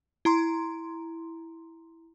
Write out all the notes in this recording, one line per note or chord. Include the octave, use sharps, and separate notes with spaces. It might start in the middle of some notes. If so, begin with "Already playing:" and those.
E4 A#5 C6